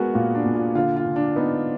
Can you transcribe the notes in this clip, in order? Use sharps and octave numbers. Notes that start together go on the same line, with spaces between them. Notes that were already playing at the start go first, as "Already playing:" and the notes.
Already playing: G#3 B3 F#4 G#4 A#4
A#2 F4
D4
A#2
F4
D3 F4
F4
D3
D4
B3 D#4